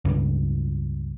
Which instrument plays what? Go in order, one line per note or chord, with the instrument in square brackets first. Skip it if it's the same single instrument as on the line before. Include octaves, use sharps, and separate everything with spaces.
[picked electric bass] C#2 G2